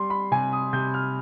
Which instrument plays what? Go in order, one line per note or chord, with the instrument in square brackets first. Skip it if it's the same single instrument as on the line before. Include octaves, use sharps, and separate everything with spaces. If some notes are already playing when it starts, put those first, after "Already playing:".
Already playing: [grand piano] G3 C6
B5
C3 G#5
D#6
C3 G6
F6